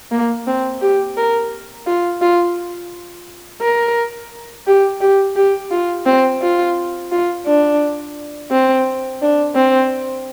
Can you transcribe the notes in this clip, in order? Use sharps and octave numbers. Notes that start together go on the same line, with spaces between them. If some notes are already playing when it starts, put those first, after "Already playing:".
A#3
C4
G4
A#4
F4
F4
A#4
G4
G4
G4
F4
C4
F4
F4
D4
C4
D4
C4